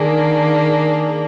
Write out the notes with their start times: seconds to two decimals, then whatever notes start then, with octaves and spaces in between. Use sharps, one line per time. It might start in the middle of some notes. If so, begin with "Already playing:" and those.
Already playing: D#3 A#3 D4 G#4
0.66 G#4